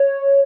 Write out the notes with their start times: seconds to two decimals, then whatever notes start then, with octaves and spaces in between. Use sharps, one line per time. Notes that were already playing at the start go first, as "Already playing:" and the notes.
Already playing: C#5